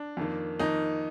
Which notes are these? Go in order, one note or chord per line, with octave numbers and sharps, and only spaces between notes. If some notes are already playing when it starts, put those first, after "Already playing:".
Already playing: D4
F2 D#3 A#3
F2 D#3 A#3 D#4